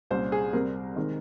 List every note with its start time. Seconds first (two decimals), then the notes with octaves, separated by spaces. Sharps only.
0.10 C2 A#2 G3 C#4 C5
0.32 G#4
0.53 C2 C3 G3 C4 A#4
0.96 D#3 G#3 C4 D#4